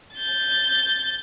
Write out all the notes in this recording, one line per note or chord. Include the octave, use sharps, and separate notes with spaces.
G6 A6